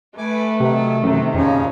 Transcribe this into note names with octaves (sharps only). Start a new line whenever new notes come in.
A3 B4 G#5 D6
C3 D#3 F#3
F#2 C3 D#3 E3
F2 A#2 C#3 F3 C#4